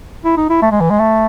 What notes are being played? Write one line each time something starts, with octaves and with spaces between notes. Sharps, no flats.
E4
D#4
E4
A3
G#3
E3
G#3
A3